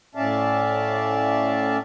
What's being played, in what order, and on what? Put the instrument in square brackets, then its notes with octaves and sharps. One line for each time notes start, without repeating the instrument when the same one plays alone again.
[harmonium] A2 C#4 D5 E5 F5 A5